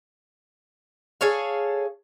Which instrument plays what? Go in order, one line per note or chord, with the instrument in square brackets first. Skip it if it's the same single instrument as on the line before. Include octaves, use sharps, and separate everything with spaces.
[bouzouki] G#4 A4 C#5 F5